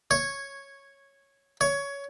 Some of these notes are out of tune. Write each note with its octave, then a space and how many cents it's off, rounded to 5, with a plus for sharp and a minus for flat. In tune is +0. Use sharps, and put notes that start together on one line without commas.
C#5 -5
C#5 +15